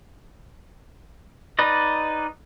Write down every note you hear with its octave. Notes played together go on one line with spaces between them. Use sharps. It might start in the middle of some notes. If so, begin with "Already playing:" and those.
D#4 B4 D5 D#5